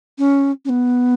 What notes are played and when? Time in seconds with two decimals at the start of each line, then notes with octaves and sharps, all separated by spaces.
0.18 C#4
0.65 C#4
0.69 B3